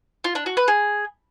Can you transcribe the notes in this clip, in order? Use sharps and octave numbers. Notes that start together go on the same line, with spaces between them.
F4
D4
F#4
B4
G#4